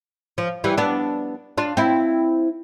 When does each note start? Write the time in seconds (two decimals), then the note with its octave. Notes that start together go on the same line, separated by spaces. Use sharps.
0.38 F3
0.64 E3 G3
0.78 B3 D4
1.58 D4 F4
1.77 C4 E4